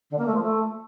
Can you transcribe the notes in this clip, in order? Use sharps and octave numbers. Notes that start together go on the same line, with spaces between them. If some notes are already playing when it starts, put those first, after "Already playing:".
D3
A#3
A3
F3
A3